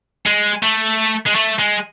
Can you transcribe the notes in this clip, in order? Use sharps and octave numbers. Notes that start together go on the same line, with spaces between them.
G#3
A3
G#3
A3
G#3